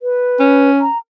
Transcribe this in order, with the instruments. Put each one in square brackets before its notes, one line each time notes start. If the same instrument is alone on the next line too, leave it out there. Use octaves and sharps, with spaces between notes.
[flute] B4
[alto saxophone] C#4
[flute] A#5